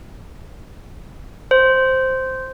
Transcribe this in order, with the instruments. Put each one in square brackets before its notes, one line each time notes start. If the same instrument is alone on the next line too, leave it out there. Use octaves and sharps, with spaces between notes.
[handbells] C5